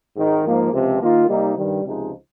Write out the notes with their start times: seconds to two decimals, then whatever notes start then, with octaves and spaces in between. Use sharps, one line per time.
0.16 G#1 G#2 D#3
0.44 G#2 F3 A#3
0.72 C#2 C3 F3 C4
1.01 D#3 A#3 F4
1.28 C3 G3 A#3 D#4
1.57 G2 D#3 G3
1.84 C#2 C3 F3 G#3 D#4